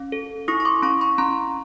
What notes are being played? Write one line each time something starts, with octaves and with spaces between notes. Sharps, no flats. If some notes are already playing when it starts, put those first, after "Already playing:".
Already playing: C#4
A4
E4 C#6 D#6
C#6
C6 D6
C#4 B5 C#6
B5 C#6
C#4 A#5 C6